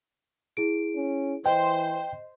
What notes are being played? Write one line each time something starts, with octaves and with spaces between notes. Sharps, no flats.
E4 G#4 D7
C#4
E3 C5 D#5 G5